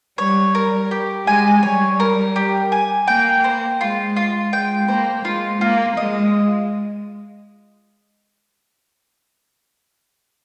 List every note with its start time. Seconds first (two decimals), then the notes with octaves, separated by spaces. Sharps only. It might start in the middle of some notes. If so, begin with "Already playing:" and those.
0.18 G3 C#5
0.55 A#4
0.91 G4
1.27 G#3 G#5
1.63 G3 C#5
2.00 A#4
2.36 G4
2.72 G#5
3.07 A#3 G5
3.44 C5
3.80 G#3 F4
4.16 F4
4.52 G#3 G5
4.88 A#3 C5
5.25 G#3 F4
5.61 A#3 F4
5.97 G#3 D#5